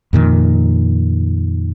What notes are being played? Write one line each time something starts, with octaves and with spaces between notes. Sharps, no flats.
F2 A#2 D#3